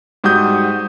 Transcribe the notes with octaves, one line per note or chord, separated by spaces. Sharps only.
G#2 G3 F#4 D#6 G6